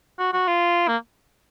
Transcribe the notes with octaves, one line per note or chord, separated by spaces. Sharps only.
F#4
F#4
F4
A#3